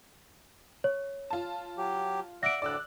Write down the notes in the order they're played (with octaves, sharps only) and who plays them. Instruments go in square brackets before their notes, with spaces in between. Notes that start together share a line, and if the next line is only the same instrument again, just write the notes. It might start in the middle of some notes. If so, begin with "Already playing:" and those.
[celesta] C#5
[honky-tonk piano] F4 A5
[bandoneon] F#3 G4
[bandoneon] D5 E5 F#5 [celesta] A#6 D7
[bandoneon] D2 A2 D3 [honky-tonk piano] D5 E6 F#6